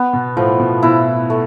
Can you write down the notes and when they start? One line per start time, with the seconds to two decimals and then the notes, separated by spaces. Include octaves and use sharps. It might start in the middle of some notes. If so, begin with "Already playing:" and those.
Already playing: B3
0.13 B2
0.37 A2 F3
0.60 B2
0.83 B2 E4
1.30 A3